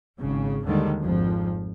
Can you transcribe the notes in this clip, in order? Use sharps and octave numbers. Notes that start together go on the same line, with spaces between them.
G#1 C#3
D#2 D3 D#3 G3 G#3
G#1 F2 F3